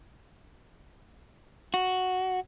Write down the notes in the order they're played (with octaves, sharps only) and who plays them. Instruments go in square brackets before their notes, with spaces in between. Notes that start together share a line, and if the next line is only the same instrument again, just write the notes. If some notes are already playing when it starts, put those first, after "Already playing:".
[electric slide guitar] F#4